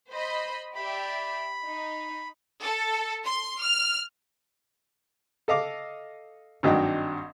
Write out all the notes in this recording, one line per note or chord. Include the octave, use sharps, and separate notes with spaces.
C5 D#5 B5
G4 D5 E5 B5
D#4
A4
C6
F6
A4 D#5 F5 D6
G#1 G2 F#3 D#4 G5